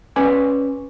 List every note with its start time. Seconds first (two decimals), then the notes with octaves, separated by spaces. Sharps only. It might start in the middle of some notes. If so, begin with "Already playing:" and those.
0.16 C#4 B4 D5 G#5